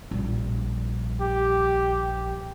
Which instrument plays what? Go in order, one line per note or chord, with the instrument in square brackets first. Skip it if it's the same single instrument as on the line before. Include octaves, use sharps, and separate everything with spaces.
[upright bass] A#1 G3
[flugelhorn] G4